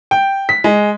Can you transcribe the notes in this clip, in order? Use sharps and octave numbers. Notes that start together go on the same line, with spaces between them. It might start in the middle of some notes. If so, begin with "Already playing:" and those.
G5
B6
G#3